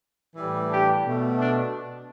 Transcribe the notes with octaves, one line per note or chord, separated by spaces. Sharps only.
A2 E3 G3
D4 G4
B2 A3
D4